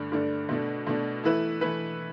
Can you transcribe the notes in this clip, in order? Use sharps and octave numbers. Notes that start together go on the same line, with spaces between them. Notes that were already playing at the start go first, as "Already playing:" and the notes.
Already playing: G2 D3 A3 D4
G2 D3 A3 D4
B2 A3 D4
B2 A3 D4
E3 A3 E4 B4
E3 A3 E4 B4